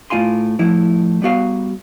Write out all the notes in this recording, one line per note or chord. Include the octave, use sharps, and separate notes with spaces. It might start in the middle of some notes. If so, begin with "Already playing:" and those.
A2 F4 F5 G#5 C6
A2 F3 E4
G3 B3 F#4 F5